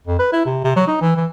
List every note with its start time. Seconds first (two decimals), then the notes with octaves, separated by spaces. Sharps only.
0.07 F2
0.19 B4
0.33 E4
0.46 C3
0.64 C3
0.76 F#3
0.87 D#4
1.01 E3
1.17 E3